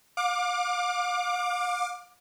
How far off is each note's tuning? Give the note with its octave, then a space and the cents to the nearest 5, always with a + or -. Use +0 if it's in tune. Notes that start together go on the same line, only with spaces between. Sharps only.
F5 +40 D6 +15